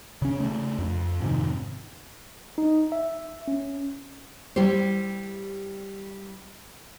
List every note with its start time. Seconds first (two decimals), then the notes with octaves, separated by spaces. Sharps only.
0.22 C#3 C#4
0.40 C#3 A3
0.79 F2
1.21 F2 G#2 C3 D#3
2.58 D#4
2.92 E5
3.48 C#4
4.56 G3 E4 G4 C5